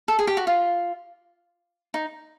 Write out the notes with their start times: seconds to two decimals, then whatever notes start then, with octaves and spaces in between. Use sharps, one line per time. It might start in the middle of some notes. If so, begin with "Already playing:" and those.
0.08 A4
0.19 G#4
0.27 G4
0.37 F#4
0.47 F4
1.94 D#4